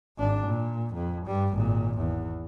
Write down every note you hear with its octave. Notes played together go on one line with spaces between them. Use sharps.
G#1 D4
A#2
F2
G2 G3
G#1 A#2
E2